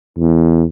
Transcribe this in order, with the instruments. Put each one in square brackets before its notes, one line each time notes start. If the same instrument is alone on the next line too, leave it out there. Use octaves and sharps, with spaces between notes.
[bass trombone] E2